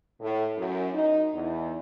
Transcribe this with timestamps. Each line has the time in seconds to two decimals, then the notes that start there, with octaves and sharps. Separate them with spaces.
0.21 A2
0.57 F#2
0.93 D#4
1.32 E2